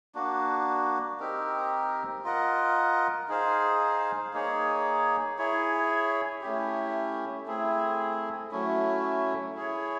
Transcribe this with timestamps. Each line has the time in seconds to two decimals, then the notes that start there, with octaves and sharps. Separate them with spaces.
0.15 A#3 D4 F#4
1.20 C4 D#4 G4 A#4
2.24 F4 A#4 D#5 F#5
3.28 D#4 G#4 C5 F5
4.33 A#3 D#4 G#4 C#5
5.38 E4 G#4 C#5
6.41 A3 C#4 E4 G4
7.46 A3 C4 E4 G#4
8.51 F#3 A3 C#4 E4
9.55 E4 G#4 C#5